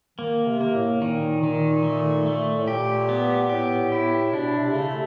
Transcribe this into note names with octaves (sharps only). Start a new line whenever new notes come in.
D#3 A#3
C3
A#3
A2
A2
A#2 D#3
D#3
A3
A3
A2
A#2 G4
B3
A2 G4
E4
B2 D4
C3
C#3 A3
C3